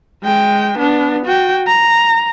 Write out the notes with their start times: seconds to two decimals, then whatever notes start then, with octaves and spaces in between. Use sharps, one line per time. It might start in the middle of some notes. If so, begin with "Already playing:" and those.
0.23 G#3 G5
0.79 B3 D4
1.26 F#4 G5
1.67 A#5